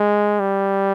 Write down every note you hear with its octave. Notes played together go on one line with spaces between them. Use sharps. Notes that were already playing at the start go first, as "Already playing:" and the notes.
Already playing: G#3
G3